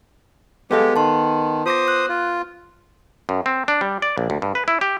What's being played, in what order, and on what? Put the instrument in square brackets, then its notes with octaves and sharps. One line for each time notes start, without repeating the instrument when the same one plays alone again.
[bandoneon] G#3 G4 [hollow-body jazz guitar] B3 A4 F5
[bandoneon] D#3 [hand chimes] A5 C6
[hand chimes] F4 D6 A#6 [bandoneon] C5 D#6
[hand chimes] F#6
[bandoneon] F4
[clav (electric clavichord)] F#2
C4
D4
G3
D5
A#1
D2
G2
B4
E4
G4